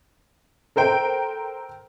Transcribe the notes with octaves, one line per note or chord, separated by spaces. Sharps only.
A4 A#4 C5 G5